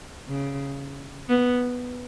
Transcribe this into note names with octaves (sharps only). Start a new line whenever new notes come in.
C#3
B3